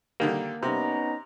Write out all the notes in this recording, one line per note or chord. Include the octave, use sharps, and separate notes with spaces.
D3 D#3 G3 A#3
C3 B3 C#4 D#4 A#5